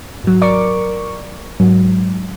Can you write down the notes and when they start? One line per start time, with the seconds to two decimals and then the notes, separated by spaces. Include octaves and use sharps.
0.24 G#1 F#3
0.41 A#4 D5 C#6 D6
1.60 G#2 F#3